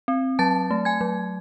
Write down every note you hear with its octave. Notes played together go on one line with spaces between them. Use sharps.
C4
F#3 A5 A6
A3
G#5 G#6
F#3